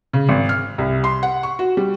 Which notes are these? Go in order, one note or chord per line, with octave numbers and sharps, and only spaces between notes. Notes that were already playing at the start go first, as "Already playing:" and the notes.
C#3
G#1
F6
C2
C6
F#5
C#6
F#4
G3